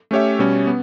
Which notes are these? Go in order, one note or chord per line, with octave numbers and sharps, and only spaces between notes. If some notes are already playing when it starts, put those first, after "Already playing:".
A3 C#4 G4 C#5 E5
B2 G3 C#4
B3